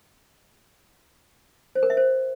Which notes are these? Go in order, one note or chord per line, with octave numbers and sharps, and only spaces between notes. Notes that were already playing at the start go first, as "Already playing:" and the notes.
C5
A#4
E5
C5